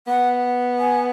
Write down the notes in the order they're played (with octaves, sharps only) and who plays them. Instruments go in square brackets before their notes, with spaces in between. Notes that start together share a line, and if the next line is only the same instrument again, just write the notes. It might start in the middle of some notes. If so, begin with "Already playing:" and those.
[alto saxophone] B3 [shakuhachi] F#5
[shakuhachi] G#5